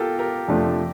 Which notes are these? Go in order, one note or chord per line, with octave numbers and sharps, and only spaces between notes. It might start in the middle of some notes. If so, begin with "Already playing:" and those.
Already playing: F4 G4 A4 A#4
G4 A#4
F2 C3 F3 A3 D4